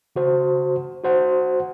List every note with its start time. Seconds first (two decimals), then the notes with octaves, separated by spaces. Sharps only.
0.16 C#3 F#4 C5
1.04 F#4 C5 F#5